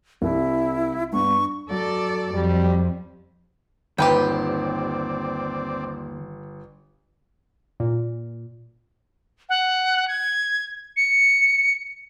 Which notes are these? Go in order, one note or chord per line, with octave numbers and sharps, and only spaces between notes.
C2 E4
G2 B3 D4 C#6
F#3 A4 D5
F2 G3
G1 D#2 C4 G4 B4 D5 G5
A#2
F#5
G#6
C#7